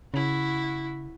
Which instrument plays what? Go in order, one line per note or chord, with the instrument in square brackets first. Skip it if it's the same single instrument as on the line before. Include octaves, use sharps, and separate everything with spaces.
[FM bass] C#3 [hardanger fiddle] E4 F#4